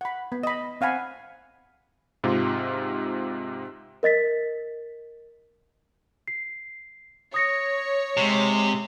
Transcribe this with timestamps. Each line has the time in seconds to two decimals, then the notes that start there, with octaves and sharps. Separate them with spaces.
0.01 F#5 B5
0.32 B3 B5
0.43 D#5 B5
0.81 C4 F5 F#5 G#5 B5
2.24 G#2 C3 F4
4.03 A#4 D#5 A6 B6
6.28 C7
7.34 C#5 D#6 A#6 C#7
8.17 C3 G#3